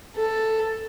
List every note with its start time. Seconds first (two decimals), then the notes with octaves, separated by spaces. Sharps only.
0.16 A4